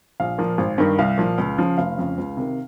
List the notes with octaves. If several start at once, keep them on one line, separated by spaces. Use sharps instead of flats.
A#1 F5
A#2 F3
G#1
G2 D#3
C2 F5
A#2 F3
C#2
C#3 F3
F1 F5
F2 C#3
C#2
C3 D#3